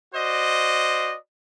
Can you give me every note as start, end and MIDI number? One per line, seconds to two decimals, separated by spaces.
0.15 1.16 66
0.15 1.16 72
0.15 1.16 74
0.15 1.16 75